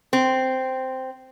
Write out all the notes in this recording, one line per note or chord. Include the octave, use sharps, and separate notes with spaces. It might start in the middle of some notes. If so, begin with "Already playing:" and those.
C4